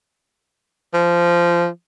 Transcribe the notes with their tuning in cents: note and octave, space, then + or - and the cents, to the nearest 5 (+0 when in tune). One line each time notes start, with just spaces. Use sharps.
F3 -15